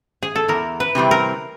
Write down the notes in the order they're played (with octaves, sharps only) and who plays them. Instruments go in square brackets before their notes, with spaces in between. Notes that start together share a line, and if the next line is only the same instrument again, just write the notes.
[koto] G#4
A4
[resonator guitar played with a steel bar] E2 [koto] A#4
[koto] B4
[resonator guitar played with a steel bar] C3 E3 G3 C4
[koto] A#4